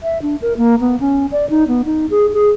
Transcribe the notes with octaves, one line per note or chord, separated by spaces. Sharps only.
E5
D4
A#4
A#3
B3
C#4
D5
D#4
B3
D#4
G#4
G#4